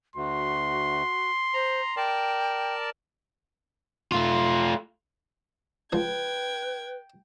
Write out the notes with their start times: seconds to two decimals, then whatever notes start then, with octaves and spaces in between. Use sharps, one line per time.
0.16 D2 F#4 C6
1.54 C5 A#5
1.97 A#4 D5 G5 A5
4.12 A3 F4
5.92 C#2 F3 F#4 B4 G5 G#6